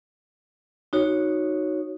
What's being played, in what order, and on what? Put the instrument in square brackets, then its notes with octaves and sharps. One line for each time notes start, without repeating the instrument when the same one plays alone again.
[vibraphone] D#4 F#4 C#5